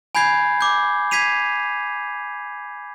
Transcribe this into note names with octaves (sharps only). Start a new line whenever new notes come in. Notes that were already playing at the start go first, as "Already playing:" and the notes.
G#5 B5 G6 G#6 C7
D6 G6
G#6 B6 C7 D#7 F7